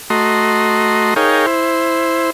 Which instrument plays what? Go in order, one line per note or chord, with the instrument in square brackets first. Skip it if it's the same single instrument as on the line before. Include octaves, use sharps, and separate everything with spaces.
[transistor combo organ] A3 F#4 D#5 A#5 C6
D#4 G#4 A#4 C#5 F5 G5
E4 C5